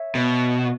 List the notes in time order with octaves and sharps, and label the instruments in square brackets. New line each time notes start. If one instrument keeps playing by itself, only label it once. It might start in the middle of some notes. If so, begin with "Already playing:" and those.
Already playing: [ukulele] C#5 E5
[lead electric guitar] B2